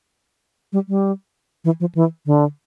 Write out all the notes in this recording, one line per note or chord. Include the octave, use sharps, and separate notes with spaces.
G3
G3
E3
F3
E3
D3